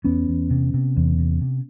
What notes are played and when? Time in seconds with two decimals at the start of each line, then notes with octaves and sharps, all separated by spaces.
0.04 E2 B3 C#4
0.28 E2
0.50 C3
0.74 C3
0.97 E2
1.19 C3
1.41 C3